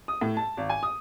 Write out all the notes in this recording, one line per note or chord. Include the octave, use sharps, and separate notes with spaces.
D#6
A2
A5
G#1
G#5
D#6